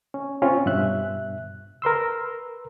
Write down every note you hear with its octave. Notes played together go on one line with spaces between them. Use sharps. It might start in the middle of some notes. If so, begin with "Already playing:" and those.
C#4
C4 C#4 F4
G2 B2 E5 F#6
A#4 B4 C6 E6